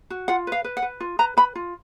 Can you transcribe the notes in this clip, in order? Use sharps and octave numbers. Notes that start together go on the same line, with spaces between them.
F#4
F4 F#5
B4 F5
B4
F#5
B4
F4
B4 A#5
B4 B5
F4